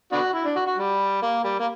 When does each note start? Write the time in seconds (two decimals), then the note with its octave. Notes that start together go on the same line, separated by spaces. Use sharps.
0.12 B3 D4 F#4
0.34 E4
0.44 D4
0.56 F#4
0.67 F#4
0.77 G3
1.22 A#3
1.44 G3
1.59 A#3